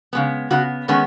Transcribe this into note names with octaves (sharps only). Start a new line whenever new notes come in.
C#3 G#3 B3
C#3 B3 F#4
D#3 G#3 B3 C#4